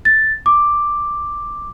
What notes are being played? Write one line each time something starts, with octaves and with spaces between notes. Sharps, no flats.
A6
D6